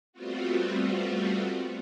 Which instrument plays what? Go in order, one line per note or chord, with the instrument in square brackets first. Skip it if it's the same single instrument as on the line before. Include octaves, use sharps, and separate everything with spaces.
[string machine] G3 A3 B3 C4 F4 F#4